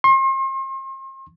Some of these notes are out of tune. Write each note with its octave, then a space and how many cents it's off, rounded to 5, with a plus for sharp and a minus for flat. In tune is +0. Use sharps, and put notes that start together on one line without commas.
C6 +40